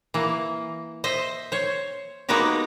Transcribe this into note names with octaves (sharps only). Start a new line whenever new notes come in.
E3 A#3
C5 D#5 E5
C5 C#5
G#3 A#3 B3 D#4 F#4 G4